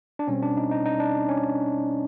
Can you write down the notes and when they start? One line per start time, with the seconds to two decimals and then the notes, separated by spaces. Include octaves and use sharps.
0.19 D4
0.28 B2 G3 C4 C#4
0.43 D4
0.57 D#4
0.71 D#4
0.85 D#4
1.00 D4
1.29 C#4